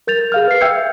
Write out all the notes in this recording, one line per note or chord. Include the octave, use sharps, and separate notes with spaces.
A#4 G6 A6 F7
G#4 F5 F6
B4 C7
E5 G5 E6 G6 G#6 C#7